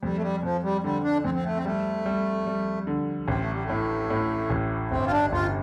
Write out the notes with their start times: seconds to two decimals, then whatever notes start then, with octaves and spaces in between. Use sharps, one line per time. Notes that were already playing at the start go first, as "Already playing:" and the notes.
0.02 F2 G3
0.17 A3
0.22 G3
0.43 F2 F3
0.63 G3
0.84 D3 G3
1.04 D4
1.24 F2 C4
1.34 C4
1.44 A3
1.56 C4
1.65 G3 A3
2.06 G3
2.47 G3
2.87 D3
3.28 A1 C4
3.40 A3
3.52 G3
3.63 A3
3.69 A2
4.10 A2
4.50 A1
4.91 G1 C4
5.07 F4
5.12 D4
5.32 G1 F4